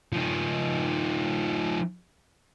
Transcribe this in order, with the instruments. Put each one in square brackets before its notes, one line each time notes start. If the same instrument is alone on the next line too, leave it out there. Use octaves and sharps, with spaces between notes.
[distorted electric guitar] F3 D#4